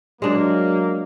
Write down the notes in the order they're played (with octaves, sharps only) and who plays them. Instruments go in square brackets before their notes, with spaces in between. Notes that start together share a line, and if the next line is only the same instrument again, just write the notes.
[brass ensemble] F#3 A#3 [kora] G#3 D4